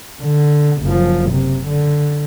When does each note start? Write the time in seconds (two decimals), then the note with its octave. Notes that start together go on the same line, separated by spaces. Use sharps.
0.22 D3
0.83 F#1 F3
1.30 C3
1.67 D3